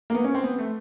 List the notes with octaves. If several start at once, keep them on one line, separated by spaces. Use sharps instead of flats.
A#3
B3
C#4
C4
B3
A3